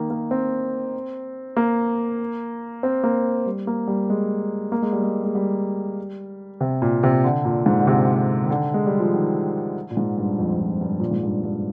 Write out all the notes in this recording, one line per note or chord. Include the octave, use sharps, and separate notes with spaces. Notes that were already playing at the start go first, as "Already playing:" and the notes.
Already playing: D#3 A#3
A#3
C4
A#3
C4
A#3
G3
A#3
G3
G#3
A#3
G#3
G3
G#3
G#3
G3
C3
A#2
C3
D3
A#2
G#2
D3
C3
D#3
D3
G#3
G3
F3
D#3
A#2
G#2
G2
F2
F2
G2
A#2
G#2
G2
G2